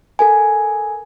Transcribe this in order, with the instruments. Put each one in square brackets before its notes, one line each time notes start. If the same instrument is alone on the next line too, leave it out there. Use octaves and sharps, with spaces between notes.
[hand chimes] A4 A#4 G#5